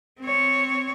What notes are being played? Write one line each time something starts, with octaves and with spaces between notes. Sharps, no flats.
C4 C#5